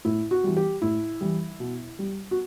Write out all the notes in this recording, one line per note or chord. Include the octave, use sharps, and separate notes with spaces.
A2 E4
F#4
E3 G3
G4
A2 E4
E3 G3
B2
G3
F#4